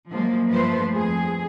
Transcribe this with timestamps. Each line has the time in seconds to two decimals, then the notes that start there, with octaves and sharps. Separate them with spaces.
0.11 F3 F#3 G#3 A#3
0.49 G2 F3 A3 B4 C5
0.94 F2 G#4